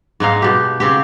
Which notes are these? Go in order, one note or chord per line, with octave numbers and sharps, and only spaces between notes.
G#2 G#3 D#4 F5
B2 G4
C#3 C4 G4